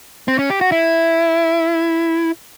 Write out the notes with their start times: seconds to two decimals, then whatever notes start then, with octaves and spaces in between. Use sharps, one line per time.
0.28 C4
0.39 C#4
0.50 G4
0.61 F#4
0.72 E4